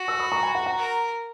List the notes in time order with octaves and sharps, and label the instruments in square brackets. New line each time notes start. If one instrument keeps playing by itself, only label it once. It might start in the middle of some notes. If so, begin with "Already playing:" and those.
Already playing: [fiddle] F#4
[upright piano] C#6 E6
B5 D#6
A#5 C#6
G#5 B5
F#5 A#5
F#5 A#5
[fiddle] A#4